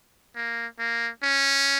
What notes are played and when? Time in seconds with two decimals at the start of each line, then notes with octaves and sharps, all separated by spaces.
0.36 A#3
0.79 A#3
1.23 C#4